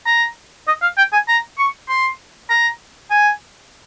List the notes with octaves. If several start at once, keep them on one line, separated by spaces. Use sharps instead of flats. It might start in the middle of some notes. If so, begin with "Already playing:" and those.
A#5
D#5
F5
G5
G#5
A#5
C#6
C6
A#5
G#5